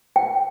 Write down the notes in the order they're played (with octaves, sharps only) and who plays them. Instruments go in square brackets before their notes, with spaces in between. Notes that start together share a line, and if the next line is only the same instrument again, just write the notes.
[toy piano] G5